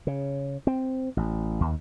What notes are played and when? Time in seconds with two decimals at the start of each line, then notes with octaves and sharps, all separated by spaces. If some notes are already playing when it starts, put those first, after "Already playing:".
0.07 C#3
0.67 C4
1.17 A1
1.61 D#2